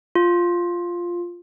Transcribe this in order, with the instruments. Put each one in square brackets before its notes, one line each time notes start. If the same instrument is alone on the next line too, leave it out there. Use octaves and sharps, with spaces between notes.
[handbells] F4